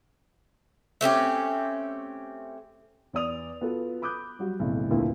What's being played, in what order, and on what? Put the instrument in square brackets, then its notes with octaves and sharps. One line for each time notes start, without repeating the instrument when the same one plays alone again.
[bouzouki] A3 C4 C#4 G4
[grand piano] E2 D5 D#6 F7
B3 F4 F#4 A4 B4
B5 D6 D#6 F#6 G6
F#3 G3 F#4
B1 F2 A2 C#3
F1 D2 A#2 A3 B3 E4